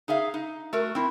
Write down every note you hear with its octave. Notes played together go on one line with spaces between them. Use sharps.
D#4 G#4 E5 F5
D#4
A3 F#4 A#4
C4 E4